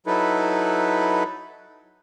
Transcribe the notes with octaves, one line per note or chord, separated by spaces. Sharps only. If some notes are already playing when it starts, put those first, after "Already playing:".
F#3 D#4 E4 A4 B4